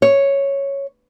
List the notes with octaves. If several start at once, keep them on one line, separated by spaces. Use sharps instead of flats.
C#5